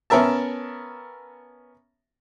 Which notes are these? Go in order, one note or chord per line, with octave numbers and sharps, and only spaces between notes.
B3 C#4 A#4 E5 A5